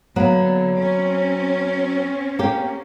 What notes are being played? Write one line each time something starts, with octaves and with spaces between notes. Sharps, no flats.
D3 F#3 A#3 B3
C4 C#4
A#3 G4